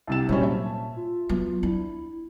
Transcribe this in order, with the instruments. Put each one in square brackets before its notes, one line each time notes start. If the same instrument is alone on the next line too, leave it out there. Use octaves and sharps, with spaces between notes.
[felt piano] C2 C3 E7 [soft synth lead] A6
[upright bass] A#2 [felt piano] F#3 G3 C#4 [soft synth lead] C5
[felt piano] E5 [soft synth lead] A5
[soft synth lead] F4
[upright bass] F#3 B3
[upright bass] D4 [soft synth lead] E4